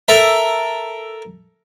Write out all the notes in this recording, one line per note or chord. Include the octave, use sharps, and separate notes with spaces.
A4 A#4 E5